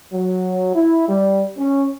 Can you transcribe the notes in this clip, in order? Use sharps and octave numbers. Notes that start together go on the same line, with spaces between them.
F#3
E4
G3
C#4